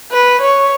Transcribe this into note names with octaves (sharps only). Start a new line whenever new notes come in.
B4
C#5